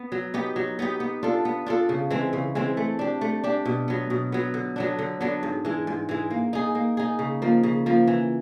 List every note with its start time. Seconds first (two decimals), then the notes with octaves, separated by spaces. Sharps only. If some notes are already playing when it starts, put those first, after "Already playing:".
Already playing: B3
0.12 F#3
0.34 B3 D#4 G4
0.56 F#3
0.79 B3 D#4 G4
1.00 B3
1.23 D4 F4 A4
1.45 B3
1.66 D4 F4 A4
1.89 C#3
2.11 E3 G#3 C4
2.33 C#3
2.55 E3 G#3 C4
2.77 A3
2.99 D4 G4
3.21 A3
3.44 D4 G4
3.66 B2
3.88 F#3 B3
4.10 B2
4.32 F#3 B3
4.54 D3
4.76 F#3 B3 D4
4.99 D3
5.21 F#3 B3 D4
5.43 G#2
5.65 E3 G#3
5.87 G#2
6.09 E3 G#3
6.30 A#3
6.53 D#4 G#4
6.75 A#3
6.97 D#4 G#4
7.19 C#3
7.42 F3 A#3
7.63 C#3
7.86 F3 A#3
8.08 E3